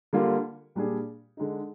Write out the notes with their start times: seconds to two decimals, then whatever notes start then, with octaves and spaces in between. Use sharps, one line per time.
0.13 D3 G3 A#3 F4
0.75 A#2 G3 D4 G#4
1.37 D3 G#3 D#4